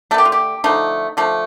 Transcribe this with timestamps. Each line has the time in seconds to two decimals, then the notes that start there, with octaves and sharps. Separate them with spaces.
0.11 A3 A4
0.14 D3 G4
0.25 F4
0.32 G4
0.64 D3 F3 A3 D#4
1.17 D3 F3 A3